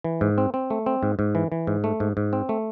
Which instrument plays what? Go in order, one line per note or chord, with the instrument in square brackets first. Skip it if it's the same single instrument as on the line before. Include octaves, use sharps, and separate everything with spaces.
[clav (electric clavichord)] E3
G#2
C4
C4
A3
C4
G#2
G#2
E3
E3
G#2
A3
G#2
G#2
C4
A3